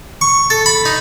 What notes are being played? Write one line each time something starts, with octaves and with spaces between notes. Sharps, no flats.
C#6
A4
B5
D#4